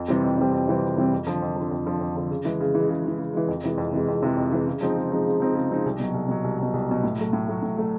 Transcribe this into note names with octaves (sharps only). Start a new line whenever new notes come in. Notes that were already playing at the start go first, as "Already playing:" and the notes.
Already playing: F2
C3 E3 G3 C4
F2
C3 E3 G3 C4
F2
C3 E3 G3 C4
F2
C3 E3 G3 C4
F2
D3 F3
F2
D3 F3
F2
D3 F3
F2
D3 F3
C#3
E3 G#3
C#3
E3 G#3
C#3
E3 G#3
C#3
E3 G#3
F2
C3 E3 G#3
F2
C3 E3 G#3
F2
C3 E3 G#3
F2
C3 E3 G#3
C#3
F3 G#3 C4 D#4
C#3
F3 G#3 C4 D#4
C#3
F3 G#3 C4 D#4
C#3
F3 G#3 C4 D#4
C2
B2 F#3
C2
B2 F#3
C2
B2 F#3
C2
B2 F#3
A2
F#3 A3
A2
F#3 A3
A2
F#3 A3